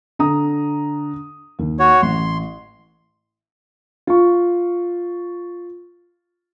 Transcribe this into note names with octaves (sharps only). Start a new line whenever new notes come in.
D3 A#5 D#6
D#2
F#4 C#5
A1 C6
F4 C#6